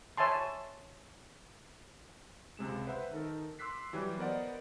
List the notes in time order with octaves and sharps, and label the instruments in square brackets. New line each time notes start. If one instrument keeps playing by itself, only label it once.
[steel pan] C#5 E5 G#5 A5 C6
[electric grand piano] C#2 C3 G#3 E7
B4 C5 E5 F#5
D#3 D#4 A4 A#4
C6 D6 E6 F#6 B6 C7
E3 F#3 G3 G4
B3 A#4 C5 D5 D#5 F#5